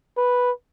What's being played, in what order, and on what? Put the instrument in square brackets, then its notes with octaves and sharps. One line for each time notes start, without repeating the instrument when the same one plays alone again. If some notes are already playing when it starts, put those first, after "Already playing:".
[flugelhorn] B4